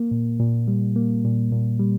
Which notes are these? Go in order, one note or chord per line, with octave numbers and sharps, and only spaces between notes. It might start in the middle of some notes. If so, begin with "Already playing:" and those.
Already playing: A#3
A#2
A#2
G3
A#3
A#2
A#2
G3